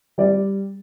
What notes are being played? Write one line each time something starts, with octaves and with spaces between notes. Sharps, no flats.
G3 D5